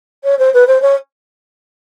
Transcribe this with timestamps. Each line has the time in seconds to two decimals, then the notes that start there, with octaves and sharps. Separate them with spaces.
0.24 C#5
0.39 C5
0.53 B4
0.67 C5
0.82 C#5